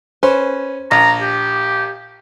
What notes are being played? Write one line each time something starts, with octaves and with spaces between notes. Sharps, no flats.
C#4 B4 C5
A#1 A#5
G4